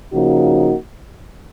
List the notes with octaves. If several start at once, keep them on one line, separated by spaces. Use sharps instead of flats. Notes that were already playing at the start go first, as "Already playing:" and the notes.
C#3 F3 A#3 D#4 F#4